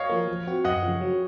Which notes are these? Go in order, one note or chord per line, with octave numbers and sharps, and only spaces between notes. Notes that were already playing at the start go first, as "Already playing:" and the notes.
Already playing: C#5 D#5 F5
F3 A#3
F3
C4 F#4
F#2 D#5 F#5
C#3 F3
F#3